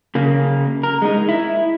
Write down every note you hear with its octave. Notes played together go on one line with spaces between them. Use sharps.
C#3 A#3
A#4
G#3 D#4
E4